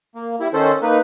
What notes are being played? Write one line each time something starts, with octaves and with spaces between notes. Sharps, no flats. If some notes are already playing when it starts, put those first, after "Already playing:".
A#3
G3 E4
D#3 C#4 A4 C5
A#3 D#4 B4